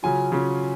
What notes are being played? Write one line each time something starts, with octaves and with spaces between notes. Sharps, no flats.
C#3 F#3 C#4 F4 G#5
C#3 F#3 C#4 F4